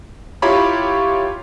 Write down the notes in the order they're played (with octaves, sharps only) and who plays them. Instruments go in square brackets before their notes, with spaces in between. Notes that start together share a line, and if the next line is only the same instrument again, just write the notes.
[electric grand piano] E4 F4 G4 C#5 A#5 B5